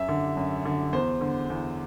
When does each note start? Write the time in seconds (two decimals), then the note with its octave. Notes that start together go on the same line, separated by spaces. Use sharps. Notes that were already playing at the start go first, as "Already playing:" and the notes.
Already playing: F#2 E5
0.08 D3
0.37 F#2
0.65 D3
0.93 E2 C5
1.21 D3
1.50 E2